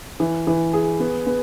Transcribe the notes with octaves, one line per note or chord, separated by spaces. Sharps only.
E3
E3
G#4
B3
B3